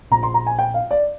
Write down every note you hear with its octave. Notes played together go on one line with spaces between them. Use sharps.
A#1 A#2 A#5
C6
A#5
G#5
G5
F5
D5